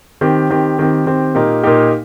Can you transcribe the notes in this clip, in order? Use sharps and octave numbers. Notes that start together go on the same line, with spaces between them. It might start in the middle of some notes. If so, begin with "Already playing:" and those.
D#3 C4 G4
D#3 C4 G4
D#3 C4 G4
D#3 C4 G4
A#2 A#3 D#4 G4
A#2 A#3 D#4 G4